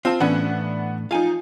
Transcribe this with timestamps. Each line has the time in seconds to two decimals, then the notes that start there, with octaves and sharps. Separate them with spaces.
0.05 C4 F4 A5
0.20 A2 E3 B3 C#4 D4 F#5
1.11 F3 D#4 F5 G#5